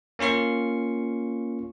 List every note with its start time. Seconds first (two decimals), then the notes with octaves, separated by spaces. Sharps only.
0.19 A#3 C#4 F4 C#6 C7